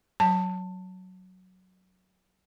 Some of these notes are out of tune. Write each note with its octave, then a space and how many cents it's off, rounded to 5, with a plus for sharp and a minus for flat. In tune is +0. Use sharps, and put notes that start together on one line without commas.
F#3 +0 A5 +20